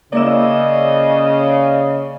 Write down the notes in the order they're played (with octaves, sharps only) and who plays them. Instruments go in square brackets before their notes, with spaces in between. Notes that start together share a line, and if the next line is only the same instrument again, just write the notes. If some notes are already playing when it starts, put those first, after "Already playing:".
[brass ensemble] C#3 [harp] A#3 E4 E6 [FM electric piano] D5 [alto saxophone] D#5